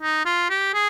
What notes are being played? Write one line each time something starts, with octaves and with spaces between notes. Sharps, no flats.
D#4
F4
G4
G#4